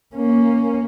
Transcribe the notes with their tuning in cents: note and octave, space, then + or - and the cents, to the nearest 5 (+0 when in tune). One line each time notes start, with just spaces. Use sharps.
A#3 +0 C#4 +5